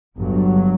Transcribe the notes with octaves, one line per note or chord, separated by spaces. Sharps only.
G1 G2 F#3